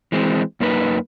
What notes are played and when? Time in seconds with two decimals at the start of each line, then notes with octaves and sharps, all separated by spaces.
0.12 E3 G#3 C4
0.60 F#2 A#3 D#4 B4